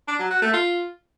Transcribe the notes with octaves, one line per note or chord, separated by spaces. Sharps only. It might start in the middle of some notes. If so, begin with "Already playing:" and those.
D4
F#3
F#4
A3
F4